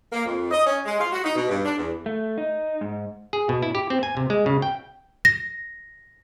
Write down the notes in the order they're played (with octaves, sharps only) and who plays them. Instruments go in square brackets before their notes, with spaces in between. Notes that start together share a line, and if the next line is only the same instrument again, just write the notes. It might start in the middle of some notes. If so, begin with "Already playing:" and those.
[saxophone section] A#3
F2
D#5
C#4
G#3
F4
F#4
D#4
B2
G2
D4
E2
[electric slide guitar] A3
D#4
G#2
[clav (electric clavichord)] G#4
B2
E4
G4
C4
G#5
C3
G#3
C#3
G5
[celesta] A#6